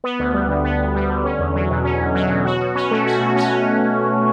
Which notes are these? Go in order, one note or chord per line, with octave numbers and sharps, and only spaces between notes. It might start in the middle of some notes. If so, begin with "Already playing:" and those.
B3
D2
G3
D3
B3
D2
G3
D3
C#4
E2
F#3
B2
C#4
E2
F#3
B2
F#4
B2
C#4
A3
F#4
B2
C#4